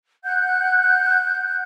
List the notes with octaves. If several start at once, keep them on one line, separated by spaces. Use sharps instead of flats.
F#5 F#6 G6